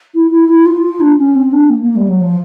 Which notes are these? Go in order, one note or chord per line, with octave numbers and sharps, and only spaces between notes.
E4
E4
E4
F4
F4
D4
C#4
C4
D4
A#3
A#3
G3
F#3
F3